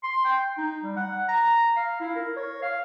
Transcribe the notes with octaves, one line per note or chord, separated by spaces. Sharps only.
C6
G5
D#4
G3
F#5
A#5
F5
E4
A#4
C#5
F5